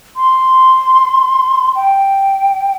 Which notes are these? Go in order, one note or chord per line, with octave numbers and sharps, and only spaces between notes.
C6
G5